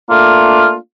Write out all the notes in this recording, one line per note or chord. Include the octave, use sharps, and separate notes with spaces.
A3 A#3 D4 F4